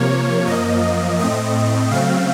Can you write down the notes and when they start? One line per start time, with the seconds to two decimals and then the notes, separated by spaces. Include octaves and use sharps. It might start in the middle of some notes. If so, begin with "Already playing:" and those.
Already playing: C3 F3 A#3 C#5
0.47 F#2 F3 A#3 D#5
1.19 A2 A3 C4 D#5
1.91 C#3 F#3 A3 C4 F5